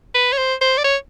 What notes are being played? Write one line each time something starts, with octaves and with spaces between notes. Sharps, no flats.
B4
C#5
C5
C5
D5
C#5